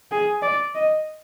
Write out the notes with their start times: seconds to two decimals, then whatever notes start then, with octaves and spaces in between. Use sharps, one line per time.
0.11 G#4
0.42 D5
0.75 D#5